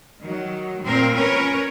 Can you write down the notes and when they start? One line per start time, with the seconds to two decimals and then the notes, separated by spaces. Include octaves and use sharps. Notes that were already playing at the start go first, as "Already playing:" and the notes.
0.20 D#3 F#3
0.83 A#2 C4 A#4
1.14 C#4 A#4 B4 C#5